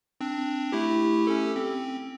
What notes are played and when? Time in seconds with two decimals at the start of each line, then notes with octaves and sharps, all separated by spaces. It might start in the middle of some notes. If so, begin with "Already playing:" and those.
0.21 C4 D4
0.72 A3 E4 G4
1.27 C#4 G4 A4
1.56 C4